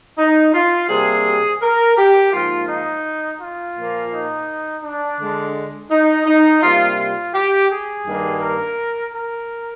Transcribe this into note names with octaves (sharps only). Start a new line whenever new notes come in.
D#4
F4
C3 G3 A#3 G#4
A#4
G4
G#2 F3 A#3 F4
D#4
F4
A#2 F3 A#3
D#4
D4
D3 G#3
D#4
D#4
C3 G3 A#3 F4
F4
G4
G#4
G2 D#3 G3 A#3
A#4
A#4